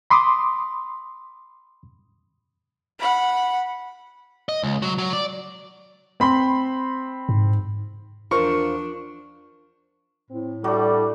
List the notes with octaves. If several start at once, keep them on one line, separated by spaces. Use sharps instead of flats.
B5 C6 D6 D#6
F#5 B5
D#5
C#2
F#3
F#3
D5
C4 B5 C6
G#2
E2 F3 D4 F4 A#4 C5 C#6
A2 C4
G3 A3 D4 F#4 A4